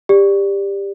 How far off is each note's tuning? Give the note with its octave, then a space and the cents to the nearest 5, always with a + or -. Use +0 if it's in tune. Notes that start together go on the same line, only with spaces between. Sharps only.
G4 +20 D5 +0